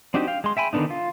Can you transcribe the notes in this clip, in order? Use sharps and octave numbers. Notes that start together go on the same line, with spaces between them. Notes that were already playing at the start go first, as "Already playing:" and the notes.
C4 D4 D#4 F#4 G4
F5 G5
G#3 C6
E5 G5 G#5 B5
D3 D#3 B3 D4 D#4
F4